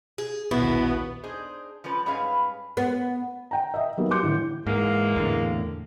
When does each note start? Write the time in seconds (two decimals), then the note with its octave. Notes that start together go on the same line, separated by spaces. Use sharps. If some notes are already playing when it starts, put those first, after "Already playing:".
0.18 G#4
0.51 A#1 D#2 B2 B3 E4
1.23 D4 D#4 G#4 C5
1.84 F3 G3 C#4 B4
2.06 G#2 G3 C#4 G#4 B4 F5
2.77 B3
3.51 G5 A#5
3.74 D#5 E5
3.97 F#3 G3 A#3 B3 D#4
4.11 C6 D6 G6 C#7
4.23 A2 D3 E3
4.67 G#2 E3 G#3 A#3
5.16 E2 A2 D3